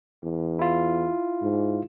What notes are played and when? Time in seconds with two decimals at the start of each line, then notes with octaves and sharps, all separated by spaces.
0.24 E2
0.59 E4 F4
1.42 G#2